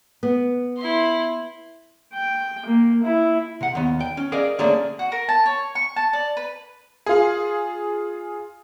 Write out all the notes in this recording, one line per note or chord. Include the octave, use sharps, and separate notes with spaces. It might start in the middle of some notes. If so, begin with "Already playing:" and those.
B3
E4 C6
G5
A#3
E4
C3 F#5
D#2 B3
G5
C#4
G#4 A#4 D5 D#5 F5
D3 A3 A#3 C#4 G#4 D5
F#4
A#4
A5
C#5
C#6
A5
D5
B4
F4 G#4